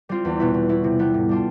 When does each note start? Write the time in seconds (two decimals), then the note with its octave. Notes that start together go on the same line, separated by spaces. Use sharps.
0.09 G3 C4 F4
0.25 E2
0.40 B2 B3 E4
0.54 B2
0.69 B3 E4
0.84 C3
0.99 G3 B3
1.14 A2
1.29 G3 D4 F4